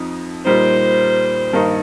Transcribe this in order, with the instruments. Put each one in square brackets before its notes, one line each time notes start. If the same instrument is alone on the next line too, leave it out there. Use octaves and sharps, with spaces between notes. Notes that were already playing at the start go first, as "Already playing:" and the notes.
Already playing: [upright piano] F2 F3 D#4
[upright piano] A#2 G3 D#4 [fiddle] C5
[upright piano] G2 D#3 A#3 D#4